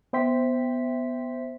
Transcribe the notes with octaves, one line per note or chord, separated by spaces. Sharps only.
B3 C5 E5 G5 C6 B6